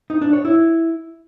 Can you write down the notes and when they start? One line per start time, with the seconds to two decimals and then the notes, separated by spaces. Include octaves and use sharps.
0.10 D#4
0.21 D4
0.33 C#5
0.45 E4